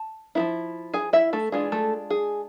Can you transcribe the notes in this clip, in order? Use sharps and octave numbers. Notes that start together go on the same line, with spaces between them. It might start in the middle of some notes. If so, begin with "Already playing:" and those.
Already playing: A5
F3 B3 E4
G#4 G#5
E4 E5
A3 A4
E3 G#3 D4 F4 G#4
A3 A4
G#4